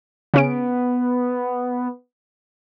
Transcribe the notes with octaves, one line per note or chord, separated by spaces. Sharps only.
C#3 B3 C#4 D7